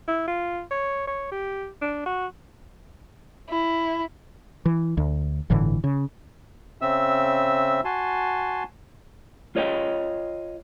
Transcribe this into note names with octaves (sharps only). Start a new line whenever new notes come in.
E4
F4
C#5
C#5
G4
D4
F#4
E4
E3
D2
G1 A2 D3 E3
C#3
C#3 C4 E5 E6
F#4 G#5 A5 C6
F4 C#5 D#5 F5 G5